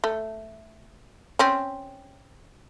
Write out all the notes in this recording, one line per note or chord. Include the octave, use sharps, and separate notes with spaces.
A3
C4 C#4